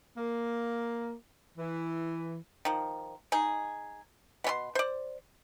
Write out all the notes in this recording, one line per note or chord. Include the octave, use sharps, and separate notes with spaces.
A#3
E3
D#3 F3
D#4 G#4
B2 C#4 C6
C5 D5